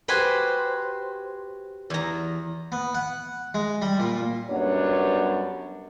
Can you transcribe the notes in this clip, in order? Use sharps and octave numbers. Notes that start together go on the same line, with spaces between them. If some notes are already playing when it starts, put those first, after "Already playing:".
F#4 G4 B4 C5 G#5
E2 A#5
B3
F#5
G#3
G3
A#2
F#2 G3 B3 D4 C#5